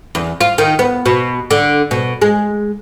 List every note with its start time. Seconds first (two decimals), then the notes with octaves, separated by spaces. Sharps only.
0.15 E2
0.41 F4
0.58 D#3
0.79 B3
1.06 B2
1.51 D3
1.91 B2
2.22 G#3